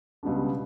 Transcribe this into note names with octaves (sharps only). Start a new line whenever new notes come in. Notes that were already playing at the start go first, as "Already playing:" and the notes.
C#2 B2 G3 B3 D4